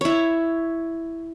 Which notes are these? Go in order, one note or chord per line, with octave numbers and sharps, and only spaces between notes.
E4 C#5